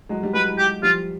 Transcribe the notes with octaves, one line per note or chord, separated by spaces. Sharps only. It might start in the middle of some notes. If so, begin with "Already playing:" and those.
F#3 G#3
G3
F#3 G#3 B4
G4
F3 G3 F4